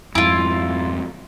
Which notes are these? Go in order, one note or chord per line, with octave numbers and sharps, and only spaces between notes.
F2 G#2 E4 F4